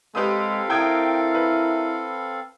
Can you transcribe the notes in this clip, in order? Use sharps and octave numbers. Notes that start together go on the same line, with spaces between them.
G#3 C4 G4 A4 B4 F5 D#6
E4 A#4 G5 D#6 G#6
B4